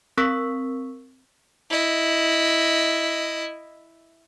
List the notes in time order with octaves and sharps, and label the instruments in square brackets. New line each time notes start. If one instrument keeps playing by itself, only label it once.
[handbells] C4 A#4 C#6 E6 B6
[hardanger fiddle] E4 D#5